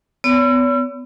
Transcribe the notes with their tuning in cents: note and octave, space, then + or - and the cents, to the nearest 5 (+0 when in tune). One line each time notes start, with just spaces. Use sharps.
B3 +30 C#5 +45 E6 +40